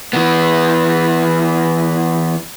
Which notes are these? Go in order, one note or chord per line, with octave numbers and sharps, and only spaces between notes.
E3 B3